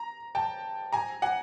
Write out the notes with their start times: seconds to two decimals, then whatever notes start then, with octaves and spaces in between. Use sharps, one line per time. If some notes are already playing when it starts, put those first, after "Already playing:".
Already playing: A#5
0.35 G5 A5
0.93 G#5 A#5
1.22 F#5 G#5